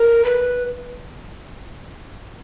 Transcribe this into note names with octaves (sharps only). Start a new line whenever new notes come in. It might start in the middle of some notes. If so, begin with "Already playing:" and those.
Already playing: A#4
B4